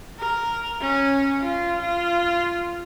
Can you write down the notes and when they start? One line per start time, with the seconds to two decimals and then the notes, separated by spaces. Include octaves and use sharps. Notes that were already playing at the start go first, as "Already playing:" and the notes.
0.20 A#4
0.81 C#4
1.41 F4
1.82 F4